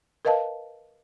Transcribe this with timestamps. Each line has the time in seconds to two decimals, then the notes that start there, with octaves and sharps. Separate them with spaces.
0.25 A#4 B4 D#5 F5 A5